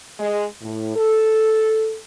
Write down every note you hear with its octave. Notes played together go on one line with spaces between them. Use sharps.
G#3
A2
A4